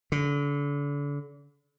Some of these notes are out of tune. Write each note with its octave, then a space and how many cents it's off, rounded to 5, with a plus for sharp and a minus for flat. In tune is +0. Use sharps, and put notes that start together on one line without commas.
D3 -35